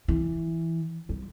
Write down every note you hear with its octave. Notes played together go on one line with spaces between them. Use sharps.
E3
G3